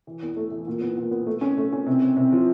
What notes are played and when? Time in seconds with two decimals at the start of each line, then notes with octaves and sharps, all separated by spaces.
0.07 E3
0.22 E2
0.37 A3
0.51 E3
0.67 A#2
0.81 B3
0.97 A#2
1.11 B3
1.27 A3
1.41 C#4
1.57 A3
1.73 C#4
1.86 C3
2.02 C3
2.17 C3
2.32 F3